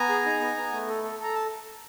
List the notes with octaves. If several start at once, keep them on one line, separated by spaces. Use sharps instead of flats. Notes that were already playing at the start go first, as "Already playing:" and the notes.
Already playing: B3 G#5 A#5
G#4
D#4
B3
B3
A3
A4
A4
A4 A#5
A5